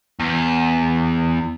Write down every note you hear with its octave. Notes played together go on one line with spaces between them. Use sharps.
E2